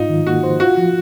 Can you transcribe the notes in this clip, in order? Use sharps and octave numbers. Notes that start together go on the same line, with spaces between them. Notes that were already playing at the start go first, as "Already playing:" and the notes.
Already playing: G#2 D#4 F4
D#3
A#3 F#4
C5
F4 F#4
F3